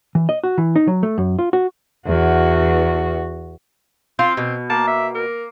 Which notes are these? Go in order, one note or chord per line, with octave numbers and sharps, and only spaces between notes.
E3
D#5
F#4
E3
D#4
F#3
A3
F#2
F4
F#4
E2 F#4
C4 F4
B2
A#3 A5
E5
A#4